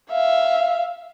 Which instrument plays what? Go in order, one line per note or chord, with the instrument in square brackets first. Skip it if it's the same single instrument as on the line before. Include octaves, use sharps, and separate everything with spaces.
[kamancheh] E5 F5